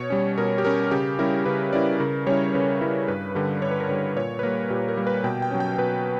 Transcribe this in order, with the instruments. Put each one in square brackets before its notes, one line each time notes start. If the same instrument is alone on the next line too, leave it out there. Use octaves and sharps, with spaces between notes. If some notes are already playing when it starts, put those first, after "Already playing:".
Already playing: [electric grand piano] B2 C#5
G3 C#4
B2 A#4
G4
G3 C#4 A#4
C#3 G4
G3 C#4 E4 A#4
C#3 B4
G3 C#4 E4 D5
C#3 A#4
G3 C#4 E4 C#5
C#3 B4
G3 C#4 E4 A#4
G2 B4
D3 G3 A#4
G2 C#5
B4
A#4
D3 G3 B4
A#2 C#5
B4
G3 A#3 A#4
A#2 G4
A#4
G3 A#3
B4
B2 G5
G5
F#3 C#4
G5
B2 B4